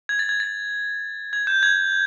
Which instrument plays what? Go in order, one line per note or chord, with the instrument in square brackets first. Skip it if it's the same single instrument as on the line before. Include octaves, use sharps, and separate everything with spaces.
[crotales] G#6
A6
G#6
A6
G#6
G6
G#6